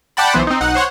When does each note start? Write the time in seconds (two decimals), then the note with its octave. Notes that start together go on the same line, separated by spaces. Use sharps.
0.17 D5 F#5 G5 A5 B5
0.34 B1 E3 B3 C5
0.47 C4 D#4
0.61 B1 D#4 F#5
0.75 C5 C#5 F#5